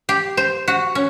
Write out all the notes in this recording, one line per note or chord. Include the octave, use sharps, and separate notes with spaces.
G4
C5
F#4
C#4